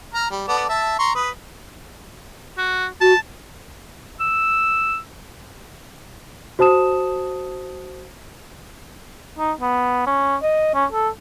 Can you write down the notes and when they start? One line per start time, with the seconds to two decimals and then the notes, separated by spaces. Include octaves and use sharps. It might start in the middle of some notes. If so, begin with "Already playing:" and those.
0.14 A#5 F6
0.31 G3
0.48 B3 A4 D5
0.69 E5 A5
0.99 A#5 C6 C#6
1.15 B4 D#6
2.58 F#4
3.01 F#4 A5
4.20 E6
6.59 F#4 C5 A5 D#6 E7
9.39 D#4
9.61 B3
10.07 C#4
10.43 D#5
10.75 C#4
10.92 A4